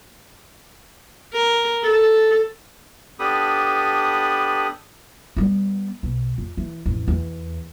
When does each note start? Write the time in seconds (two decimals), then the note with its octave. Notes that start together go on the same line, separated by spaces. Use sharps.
1.34 A#4
1.84 A4
3.19 B3 D4 G4 A4 B5 D#6
5.37 G3 B3
6.03 B1
6.38 F2
6.57 E3
6.86 A1 F2
7.08 E2